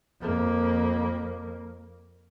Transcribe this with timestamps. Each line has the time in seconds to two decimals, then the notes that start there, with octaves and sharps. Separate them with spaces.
0.21 F2 A#3